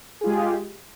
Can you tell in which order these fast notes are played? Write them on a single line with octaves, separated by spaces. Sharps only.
G#4 F4 G#3 G4